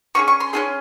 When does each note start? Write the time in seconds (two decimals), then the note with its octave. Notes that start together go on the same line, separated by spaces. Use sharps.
0.15 C#4 F4 G#4 C#6
0.28 C#6
0.40 C6
0.53 C#4 F4 G#4 C6